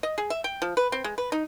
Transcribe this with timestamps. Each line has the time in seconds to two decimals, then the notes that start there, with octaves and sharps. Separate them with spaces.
0.03 D#5
0.18 G#4
0.30 E5
0.44 G5
0.62 F3
0.77 B4
0.92 C4
1.04 G#3
1.18 B4
1.32 D#4